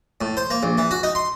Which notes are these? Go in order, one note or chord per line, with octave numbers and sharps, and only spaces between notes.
A2
C5
A#3
A#1
E3
F#4
D#4
C6